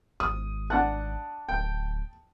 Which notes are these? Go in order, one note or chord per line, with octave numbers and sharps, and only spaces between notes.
G#1 D#6
D4 F#5 A5 F#6
D1 G5